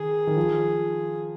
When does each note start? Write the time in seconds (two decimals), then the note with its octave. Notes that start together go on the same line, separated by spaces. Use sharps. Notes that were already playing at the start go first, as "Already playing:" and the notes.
Already playing: D#3 G#4
0.27 D#3
0.36 F3